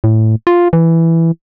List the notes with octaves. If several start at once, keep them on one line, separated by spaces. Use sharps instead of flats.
A2
F4
E3